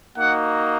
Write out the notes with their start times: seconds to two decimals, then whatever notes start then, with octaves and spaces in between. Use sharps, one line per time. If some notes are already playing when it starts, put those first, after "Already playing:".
0.17 A#3 D#4 F#4 F#5